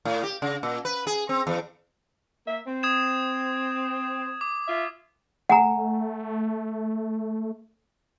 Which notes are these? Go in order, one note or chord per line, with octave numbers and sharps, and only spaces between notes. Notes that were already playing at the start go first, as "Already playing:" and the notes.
A2
G4
C#3
A#2
B4
G#4
C4
E2
A#3 E5
C4
D#6 G#6 E7
D6
F4 E5
A3 F#5 G#5 A#5